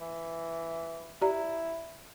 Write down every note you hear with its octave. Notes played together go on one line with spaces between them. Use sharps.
E3
E4 G4 D5 A#5